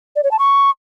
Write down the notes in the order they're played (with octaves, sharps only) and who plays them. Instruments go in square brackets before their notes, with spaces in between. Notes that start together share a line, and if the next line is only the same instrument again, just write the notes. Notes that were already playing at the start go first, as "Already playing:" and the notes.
[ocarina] D5
C#5
A5
C#6